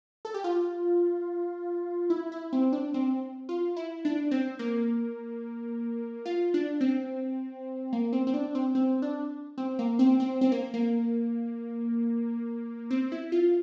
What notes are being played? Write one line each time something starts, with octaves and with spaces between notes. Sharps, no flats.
A4
G4
F4
E4
E4
C4
D4
C4
F4
E4
D4
C4
A#3
F4
D4
C4
A#3
C4
C4
D4
C4
C4
D4
C4
A#3
C4
C4
C4
A#3
A#3
C4
E4
F4